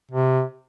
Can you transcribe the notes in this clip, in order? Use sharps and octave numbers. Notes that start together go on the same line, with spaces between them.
C3